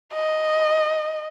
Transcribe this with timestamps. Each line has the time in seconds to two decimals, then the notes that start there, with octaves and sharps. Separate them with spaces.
0.14 D#5